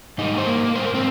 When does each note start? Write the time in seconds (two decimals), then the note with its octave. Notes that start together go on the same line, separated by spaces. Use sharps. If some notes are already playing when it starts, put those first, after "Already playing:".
0.18 G#2 G3 A#3 D#4
0.38 C5
0.47 A#3 A#4
0.75 G#2 G3 A#3 C5
0.85 A#4
0.94 C4 C5